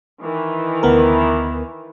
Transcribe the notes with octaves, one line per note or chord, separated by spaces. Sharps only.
D#3 E3
D2 B3 A#4